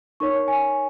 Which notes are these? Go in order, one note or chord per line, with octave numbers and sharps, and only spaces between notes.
D#4 A#4 C#5 C#6
G#5